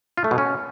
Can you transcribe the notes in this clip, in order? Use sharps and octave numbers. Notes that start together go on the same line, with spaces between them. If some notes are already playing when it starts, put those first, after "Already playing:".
F4
A3
B2
C#4